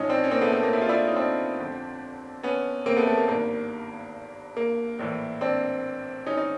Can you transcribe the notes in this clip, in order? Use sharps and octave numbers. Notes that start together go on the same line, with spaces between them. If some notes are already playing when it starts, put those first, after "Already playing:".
Already playing: A1 A2 F3 C#4 D#4
C4 D4
C#4
A#3 C4
A3 B3
A3
A#3
E4
F4
D4 E4
D#4
C4 D4
G1 F2 D3 F3
B3 C#4
A#3 C4
A3 B3
A3
A#3
G#1 G2 D#3 A#3
A#3
A#1 A2 E3
C4 D4
C#4 D#4
D#4